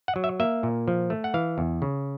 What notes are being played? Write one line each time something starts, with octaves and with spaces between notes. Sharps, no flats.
F#5
F#3
E5
A#3 E5
A#2
F3
A3
F#5
E3 F5
E2
C#3